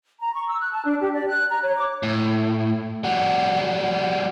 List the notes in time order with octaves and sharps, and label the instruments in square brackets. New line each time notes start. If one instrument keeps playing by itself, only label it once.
[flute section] A#5
C#6
E6
F#6
A5
D4
G4
D5
F#6
A#5
C#5
D6
[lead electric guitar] A2
G3 F#4